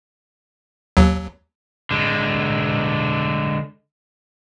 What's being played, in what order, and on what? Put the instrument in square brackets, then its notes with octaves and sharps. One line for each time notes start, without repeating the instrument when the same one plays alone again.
[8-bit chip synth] D#2 F#3
[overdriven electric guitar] D3 G#3